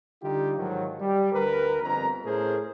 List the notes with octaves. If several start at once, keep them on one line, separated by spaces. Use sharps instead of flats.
D3 G3 D#4 F4 G4
G#2 D#3 F3 F#3
G3 G4
D2 A#4 B4
G1 F2 A#5
A2 A3 C#4 G#4 A#4 C5